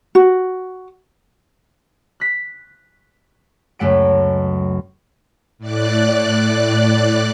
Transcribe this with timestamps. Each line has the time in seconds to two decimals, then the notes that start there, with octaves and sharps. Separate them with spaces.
0.15 F#4
2.20 F#6 B6
3.79 C#2 F#2 A3 F#5 D7
5.58 A2 D5 F#6